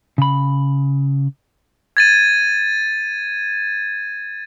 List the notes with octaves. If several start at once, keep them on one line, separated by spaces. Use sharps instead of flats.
C#3 B5
G#6 A6 D#7